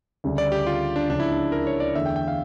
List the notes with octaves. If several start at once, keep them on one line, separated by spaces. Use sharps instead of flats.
D2 C#3 G3 D4
D5
G4
F4
D4
C#2 C#3 F3 C#4 D4
E4
D4
A#4
C#5
D5
E2 D3 A3 E5
G5
G5
F5